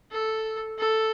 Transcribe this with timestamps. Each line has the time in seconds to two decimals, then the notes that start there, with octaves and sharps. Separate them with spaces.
0.11 A4
0.78 A4